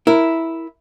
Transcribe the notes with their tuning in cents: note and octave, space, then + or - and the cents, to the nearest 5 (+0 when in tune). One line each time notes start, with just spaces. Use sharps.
E4 -5 A#4 +0